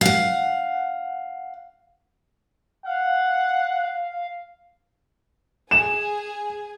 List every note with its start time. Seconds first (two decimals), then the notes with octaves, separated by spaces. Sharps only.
0.01 F5 F#5
2.86 F5 F#5
5.71 G#4 G#5 E7